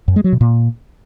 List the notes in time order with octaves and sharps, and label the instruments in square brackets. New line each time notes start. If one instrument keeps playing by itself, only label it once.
[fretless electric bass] F#2
G#3
F#3
B2
A#2